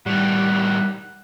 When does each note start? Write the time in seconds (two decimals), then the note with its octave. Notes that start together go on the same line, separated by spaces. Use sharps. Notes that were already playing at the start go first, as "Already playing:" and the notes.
0.06 A2 D#3 G3 F#5